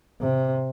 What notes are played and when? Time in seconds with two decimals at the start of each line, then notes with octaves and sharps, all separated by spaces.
0.21 C3